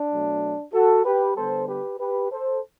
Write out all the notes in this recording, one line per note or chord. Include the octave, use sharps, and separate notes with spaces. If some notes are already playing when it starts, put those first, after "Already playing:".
Already playing: D4
B2 F#3 A3
F#4 A4
G4 B4
D3 G3 B3 A4 C5
G4 B4
G4 B4
A4 C5